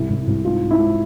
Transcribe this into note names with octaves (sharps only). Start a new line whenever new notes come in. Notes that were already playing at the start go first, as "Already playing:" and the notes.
Already playing: C2 E4
C2
C2
G#2 F4
G#2
E4
G#2